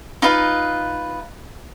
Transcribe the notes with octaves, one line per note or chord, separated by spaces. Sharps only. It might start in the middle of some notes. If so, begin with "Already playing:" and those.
D#4 F4 B4 F5